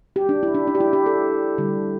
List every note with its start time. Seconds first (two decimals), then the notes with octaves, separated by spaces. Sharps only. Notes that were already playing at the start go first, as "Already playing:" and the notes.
0.16 G4
0.29 D4
0.43 E4
0.55 D4
0.67 D4
0.75 G4
0.80 E4
0.93 G4
1.06 A4
1.58 D3 G3